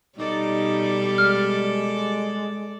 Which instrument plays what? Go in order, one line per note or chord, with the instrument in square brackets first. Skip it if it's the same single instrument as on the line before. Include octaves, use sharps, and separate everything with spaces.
[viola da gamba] B2 G3 [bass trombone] D#4 [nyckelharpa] A4 D5
[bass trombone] G#3 [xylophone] F6